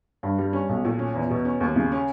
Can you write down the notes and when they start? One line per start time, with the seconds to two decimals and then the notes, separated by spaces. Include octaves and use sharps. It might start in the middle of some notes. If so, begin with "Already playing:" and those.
0.23 G2
0.38 G3
0.53 C#4
0.69 B1
0.85 A#2
0.99 C#4
1.14 E2
1.30 B2
1.45 C#4
1.61 D#2
1.76 C#3
1.92 C#4